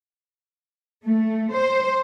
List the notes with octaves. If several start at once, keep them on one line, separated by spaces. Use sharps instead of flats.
A3
C5